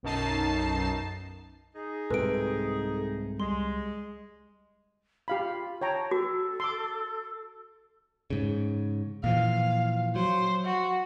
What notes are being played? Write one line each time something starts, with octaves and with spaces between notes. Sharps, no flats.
B1 F#2 D#4 A5 C7
D#4 G#4
C2 G#2 C3 A4 B4 D7
C2 G3 G#3 C6
F4 G4 F5 B5
C#5 G5 A5 A#5
F#4 A4
C6 D6
G#2 C#3
A#2 E3 F3 F5
F#3 C5
F#4